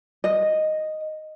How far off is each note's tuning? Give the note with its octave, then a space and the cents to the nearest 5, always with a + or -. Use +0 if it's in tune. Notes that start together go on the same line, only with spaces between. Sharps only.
D#5 -5